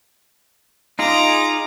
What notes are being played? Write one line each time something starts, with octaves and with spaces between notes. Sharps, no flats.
D#4 F4 G#4 A#5 D6